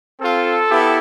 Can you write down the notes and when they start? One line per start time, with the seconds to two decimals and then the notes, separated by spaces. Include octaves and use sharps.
0.19 C4 F4 A4
0.70 B3 E4 G4